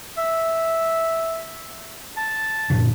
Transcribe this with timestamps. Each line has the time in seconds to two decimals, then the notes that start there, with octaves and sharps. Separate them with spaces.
0.18 E5
2.17 A5
2.70 F#2 A#2 D3